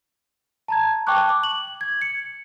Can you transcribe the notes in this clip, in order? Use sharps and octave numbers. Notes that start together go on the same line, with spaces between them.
A5 A#5 G#6
G5 A5 C#6 D6 F#6
D6
F#7
G#6
C#7